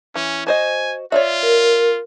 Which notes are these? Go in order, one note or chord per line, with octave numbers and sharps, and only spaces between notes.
E3 C#4
F#4 C5 D#5 G#5
F4 C#5 D5 E5
A#4